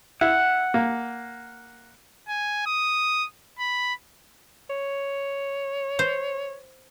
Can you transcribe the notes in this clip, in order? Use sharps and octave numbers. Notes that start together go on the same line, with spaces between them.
E4 F#5
A#3
G#5
D#6
B5
C#5
C5